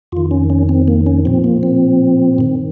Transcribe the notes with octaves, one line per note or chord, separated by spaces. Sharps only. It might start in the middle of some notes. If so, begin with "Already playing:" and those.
F2 D#3 F4
C#4
C#4
C4
A#3
C#4
A#2 F3 C4
A#3
C4
G2 D#3